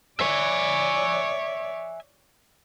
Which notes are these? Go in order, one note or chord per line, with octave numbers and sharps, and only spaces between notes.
C#5 D5 E5 G#5